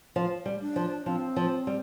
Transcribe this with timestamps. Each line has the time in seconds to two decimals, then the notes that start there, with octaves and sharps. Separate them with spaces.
0.16 F3
0.46 G3
0.61 D4
0.76 F3
1.06 F3 C4
1.36 F3
1.67 G3